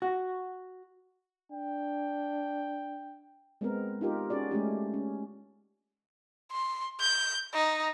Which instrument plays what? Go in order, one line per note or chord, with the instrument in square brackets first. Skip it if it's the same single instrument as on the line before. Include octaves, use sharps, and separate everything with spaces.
[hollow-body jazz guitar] F#4
[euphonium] D4 [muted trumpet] G5
[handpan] G#3 B3 C4 A#4
D#4 F4 G4 A#4
C#4 F#4 G#4 D5
G#3 A3 C#4 G4
C#4
[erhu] C6
G6
D#4